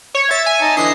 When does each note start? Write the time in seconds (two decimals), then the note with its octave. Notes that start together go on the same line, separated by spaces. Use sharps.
0.15 C#5
0.31 E5 A6
0.46 G#5
0.62 D#4 A5 A#5
0.77 D3 E3 D#5 C7